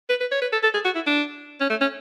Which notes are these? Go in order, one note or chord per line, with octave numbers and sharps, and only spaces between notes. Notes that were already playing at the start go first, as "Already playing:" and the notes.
B4
B4
C#5
B4
A4
A4
G#4
F#4
E4
D4
C#4
A3
C#4